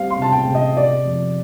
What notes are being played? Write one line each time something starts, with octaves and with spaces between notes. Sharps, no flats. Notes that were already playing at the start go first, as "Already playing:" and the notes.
Already playing: G3 C4 F5
C6
C3 A5
G5
C3
D#5
C3 D5
F2